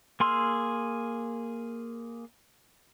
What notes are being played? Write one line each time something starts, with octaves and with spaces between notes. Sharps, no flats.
A#3 G#4 C6 E6 F6